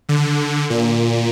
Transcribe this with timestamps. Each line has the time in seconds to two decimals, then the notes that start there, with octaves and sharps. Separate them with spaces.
0.09 D3
0.70 A#2